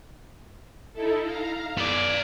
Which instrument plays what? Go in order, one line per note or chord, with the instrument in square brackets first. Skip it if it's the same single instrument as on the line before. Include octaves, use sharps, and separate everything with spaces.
[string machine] D#4 E4 A4
F5 A#5
[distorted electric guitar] B3 D5 [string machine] G#6